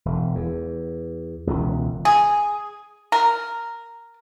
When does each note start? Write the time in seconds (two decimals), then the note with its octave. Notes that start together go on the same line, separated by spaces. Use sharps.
0.05 E1
0.35 E2
1.47 E1 C#2
2.05 G#4
3.12 A#4